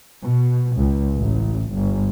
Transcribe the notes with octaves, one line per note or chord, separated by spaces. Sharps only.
B2
C#2
A1
G1